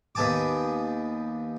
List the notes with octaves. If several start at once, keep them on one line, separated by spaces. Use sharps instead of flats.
D#2 B3 G#5 A5 D6